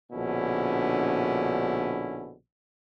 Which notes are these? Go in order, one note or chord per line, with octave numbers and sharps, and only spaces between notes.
A#1 B2 D3 C#4 E4